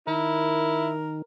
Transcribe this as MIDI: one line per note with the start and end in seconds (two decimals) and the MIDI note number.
0.07 1.22 51
0.07 0.92 64
0.07 1.20 70